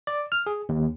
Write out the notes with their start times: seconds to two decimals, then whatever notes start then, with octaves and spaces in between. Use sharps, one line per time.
0.07 D5
0.32 F6
0.46 G#4
0.69 D#2